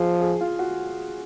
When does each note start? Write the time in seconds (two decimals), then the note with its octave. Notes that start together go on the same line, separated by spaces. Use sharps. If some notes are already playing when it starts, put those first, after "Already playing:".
Already playing: F3 G#4
0.21 G#4
0.41 F4
0.59 F#4